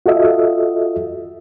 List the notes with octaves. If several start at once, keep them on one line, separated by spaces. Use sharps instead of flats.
F4 F#4 A4 D#5 E5